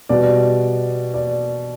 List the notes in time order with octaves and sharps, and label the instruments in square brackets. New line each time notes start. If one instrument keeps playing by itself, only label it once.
[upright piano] B2 G3 D5
D5